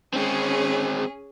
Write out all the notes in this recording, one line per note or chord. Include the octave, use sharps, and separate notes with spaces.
G#3 C4 C#4 G#4